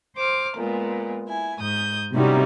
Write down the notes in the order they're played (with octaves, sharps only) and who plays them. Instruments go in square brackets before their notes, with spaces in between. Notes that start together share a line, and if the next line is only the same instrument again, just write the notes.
[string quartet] C5 D6 F6
A#2 G#3 B3
E4 G#5
G#2 D#6 G6
[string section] C3 G3 D#4 [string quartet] C#4 E4 F#4